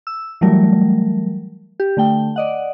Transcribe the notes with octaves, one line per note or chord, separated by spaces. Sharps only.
E6
E3 F#3 G3 A3 A#4
G4
D3 A3 G5
D5 D#5 F#5